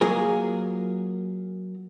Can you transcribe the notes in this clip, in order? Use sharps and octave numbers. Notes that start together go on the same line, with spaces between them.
F#3 A#3 F4 G#4 A#4